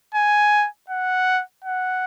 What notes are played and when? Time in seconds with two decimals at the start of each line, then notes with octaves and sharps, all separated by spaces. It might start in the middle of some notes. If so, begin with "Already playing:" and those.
0.15 G#5
0.90 F#5
1.64 F#5